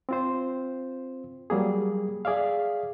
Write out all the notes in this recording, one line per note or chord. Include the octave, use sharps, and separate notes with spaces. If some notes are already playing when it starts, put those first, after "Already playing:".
C4 F4 C5
F#3 G3 A#3 G#4
G#4 D5 E5 F5